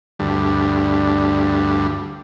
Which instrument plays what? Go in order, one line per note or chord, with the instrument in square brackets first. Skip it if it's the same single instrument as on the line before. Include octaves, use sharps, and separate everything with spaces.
[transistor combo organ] D2 G2